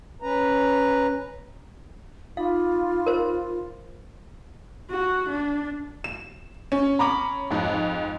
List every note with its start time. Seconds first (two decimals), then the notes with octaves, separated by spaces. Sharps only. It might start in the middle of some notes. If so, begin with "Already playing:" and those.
0.22 C#4 B4 A#5
2.37 D#4 F4 F5 B5 D6
3.06 A#4 C5
4.91 F#4
5.30 D4
6.04 E7
6.72 C#4
6.99 A#5 B5 D6
7.50 F2 G#2